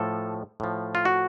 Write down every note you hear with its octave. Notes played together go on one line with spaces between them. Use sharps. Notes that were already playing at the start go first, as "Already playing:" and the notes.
Already playing: A2 F3 A4
A2 F3
F4
F#4